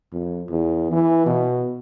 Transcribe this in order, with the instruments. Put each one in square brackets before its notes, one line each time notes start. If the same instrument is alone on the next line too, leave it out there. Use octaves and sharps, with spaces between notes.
[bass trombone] F2
E2
E3
B2